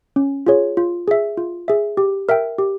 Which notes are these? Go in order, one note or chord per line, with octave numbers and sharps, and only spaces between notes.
C#4
F4 G#4 C#5
F4
G#4 E5
F4
G#4 E5
G4
A#4 E5 G5
G4